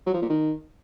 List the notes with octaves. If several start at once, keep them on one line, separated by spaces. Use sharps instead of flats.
F#3
F3
A#2
D#3